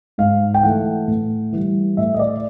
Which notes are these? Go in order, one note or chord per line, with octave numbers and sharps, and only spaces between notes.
G#2 F5
G5
E3 A3 F#5
A2
E3 G3
A2 E5
D#5
D5